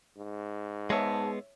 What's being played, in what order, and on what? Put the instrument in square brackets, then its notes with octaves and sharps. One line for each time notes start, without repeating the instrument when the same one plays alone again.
[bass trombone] G#2
[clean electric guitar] G#3 B3 [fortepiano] C#5 E5 [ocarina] A5